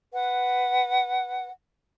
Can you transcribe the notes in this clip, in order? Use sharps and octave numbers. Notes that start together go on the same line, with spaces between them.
B4 F#5